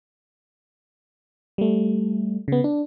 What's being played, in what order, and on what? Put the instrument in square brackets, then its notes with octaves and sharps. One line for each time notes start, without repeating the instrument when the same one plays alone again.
[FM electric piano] G3 A3
C#3 B3
D4